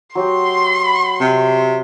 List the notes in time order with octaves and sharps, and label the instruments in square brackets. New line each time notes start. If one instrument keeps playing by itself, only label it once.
[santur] F#3 F#4 G4 [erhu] C6
[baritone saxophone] C3